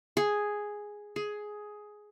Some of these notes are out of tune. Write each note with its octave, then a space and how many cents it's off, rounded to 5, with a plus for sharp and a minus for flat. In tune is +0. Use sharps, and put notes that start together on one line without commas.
G#4 +0
G#4 +10